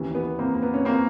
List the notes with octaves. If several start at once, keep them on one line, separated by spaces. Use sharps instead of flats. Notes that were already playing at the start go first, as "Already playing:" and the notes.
Already playing: D#2 C#3 E3
B3
A#3 C4
A#3
B3
C#4
A#3 C4